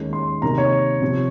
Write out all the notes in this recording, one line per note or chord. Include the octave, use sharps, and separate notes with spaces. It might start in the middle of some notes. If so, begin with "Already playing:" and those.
Already playing: D#2 D#3 G#3 C#4
C6
C3 D#3 A#3 A#5
C#5
C3 F3 C4